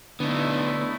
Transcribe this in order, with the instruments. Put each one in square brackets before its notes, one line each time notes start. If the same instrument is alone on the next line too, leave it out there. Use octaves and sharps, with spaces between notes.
[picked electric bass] D3 [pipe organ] A3 E4 [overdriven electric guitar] B3 D#4